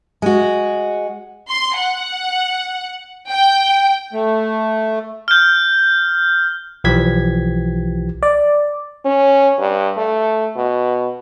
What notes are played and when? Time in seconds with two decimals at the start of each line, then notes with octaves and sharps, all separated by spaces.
0.22 G#3 F#4
1.49 C6
1.78 F#5
3.29 G5
4.13 A3
5.28 F6 G6
6.84 B1 E3 F3 G4 G#6 B6
8.23 D5
9.05 C#4
9.59 G2
9.97 A3
10.56 B2